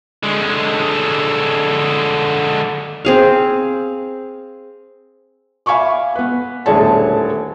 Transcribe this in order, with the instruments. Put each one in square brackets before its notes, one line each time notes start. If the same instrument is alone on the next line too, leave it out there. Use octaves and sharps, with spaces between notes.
[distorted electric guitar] D3 G#3
[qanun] C4 G#4 F5
[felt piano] E5 F5 G#5 B5 C#6 D6
B3 B4
D#1 A2 D3 G#4 C#5 A5